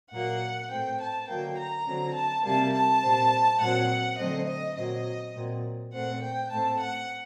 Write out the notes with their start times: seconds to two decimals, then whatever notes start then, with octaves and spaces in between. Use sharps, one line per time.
0.11 A#2 F#3 A#3 F#5
0.69 A2 A3 C4 G5
0.99 A5
1.27 D3 F#3 A#3 G5
1.57 A#5
1.86 D3 F#3 C4
2.14 A5
2.44 C3 G3 A#3 A5
2.72 A5
3.02 A#2 G3 C4
3.60 A#2 F#3 C4 F#5
4.18 D3 F#3 A3 C4 D#5
4.47 D#5
4.76 A#2 F#3 C4 D#5
5.35 A#2 F#3 C4
5.93 A#2 A3 C4 F#5
6.22 G5
6.51 A2 A3 C4 A5
6.80 F#5